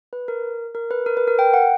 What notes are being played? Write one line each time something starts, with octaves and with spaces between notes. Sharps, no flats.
B4
A#4
A#4
B4
A#4
B4
A#4
G5
F#5